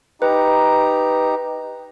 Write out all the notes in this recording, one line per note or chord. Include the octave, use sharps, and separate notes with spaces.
D#4 G4 B4 A#5